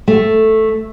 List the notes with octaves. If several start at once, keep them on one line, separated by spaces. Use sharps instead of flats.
A3